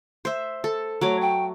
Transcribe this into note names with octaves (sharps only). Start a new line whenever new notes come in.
C5 E5
A4
F#3 A3 C#5 D6
G5